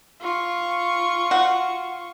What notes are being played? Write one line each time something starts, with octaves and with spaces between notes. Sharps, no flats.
F4 C#6
F#4